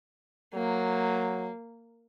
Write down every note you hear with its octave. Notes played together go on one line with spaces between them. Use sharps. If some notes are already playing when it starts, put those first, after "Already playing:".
F#3 A#3